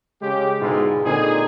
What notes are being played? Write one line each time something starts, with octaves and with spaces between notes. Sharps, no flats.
C#3 G#3 C#4 G4
G#2 B2 D3 G#3 E4 F4
A#2 D3 C4 D#4 G#4